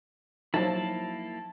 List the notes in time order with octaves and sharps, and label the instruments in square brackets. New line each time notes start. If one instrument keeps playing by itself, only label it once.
[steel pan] F3 F#3 [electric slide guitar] A#3 E4 [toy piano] D#4 [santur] A5